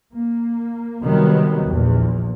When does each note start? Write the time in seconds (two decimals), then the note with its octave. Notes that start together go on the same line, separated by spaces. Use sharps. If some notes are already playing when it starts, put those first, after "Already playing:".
0.12 A#3
1.02 C3 D#3 F#3 G3 B3
1.66 A#1 E2